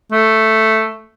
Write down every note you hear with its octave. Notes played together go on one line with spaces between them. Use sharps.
A3